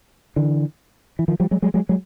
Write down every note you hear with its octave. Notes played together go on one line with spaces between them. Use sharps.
D3 E3
E3
D#3 F3
F3 G3
F#3 G#3
F#3 G#3
F#3 G#3
F#3 G#3